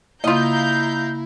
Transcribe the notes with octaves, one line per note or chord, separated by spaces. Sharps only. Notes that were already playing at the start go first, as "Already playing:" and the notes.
C#3 A#3 E4 F4 D#5 F5 A#5 G6